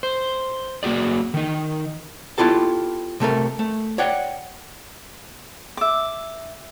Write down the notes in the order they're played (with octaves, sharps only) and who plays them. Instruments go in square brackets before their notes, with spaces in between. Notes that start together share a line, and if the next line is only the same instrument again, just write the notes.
[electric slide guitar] C5
A#3 F#4 G#4 D5
D#3 D#4
[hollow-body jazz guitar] B3 E4 F4 G4 A4 A5
C3 A3 A4 A#4
A3
C#5 D5 F#5 G5
[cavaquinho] E5 D6